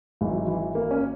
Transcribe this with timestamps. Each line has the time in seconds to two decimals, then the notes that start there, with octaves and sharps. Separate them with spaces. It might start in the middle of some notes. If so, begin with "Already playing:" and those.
0.21 G#1 G#2 E3 F#3
0.48 E3
0.75 A#3
0.91 C#4